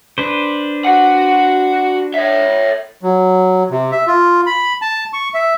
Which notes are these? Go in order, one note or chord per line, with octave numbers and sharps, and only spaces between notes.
D4 B4 C5
F#4 F#5
C#5 E5
F#3
C3
E5
F4
B5
A5
C#6
E5